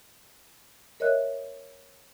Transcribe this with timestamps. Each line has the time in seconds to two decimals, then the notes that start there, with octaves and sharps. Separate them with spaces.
1.00 A#4 C#5 D#5 E5 F#6